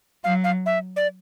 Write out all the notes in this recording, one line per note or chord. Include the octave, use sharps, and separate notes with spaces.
F#3 F5
F5
E5
D5